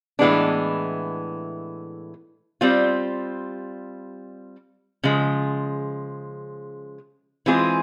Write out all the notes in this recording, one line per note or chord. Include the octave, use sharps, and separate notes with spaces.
A2 E3 G#3 B3 D4
G3 C4 F4
C#3 F3 G#3
E3 G#3 C4 F4 G#4